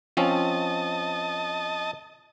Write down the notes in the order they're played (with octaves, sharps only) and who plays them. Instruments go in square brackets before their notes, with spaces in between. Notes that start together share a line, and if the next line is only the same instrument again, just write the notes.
[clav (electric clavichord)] F3 C4 C#4 [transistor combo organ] D#5 A5